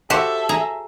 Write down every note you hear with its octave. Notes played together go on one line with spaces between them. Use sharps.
F#4 G4 A4 C5 E5
G#4 A#5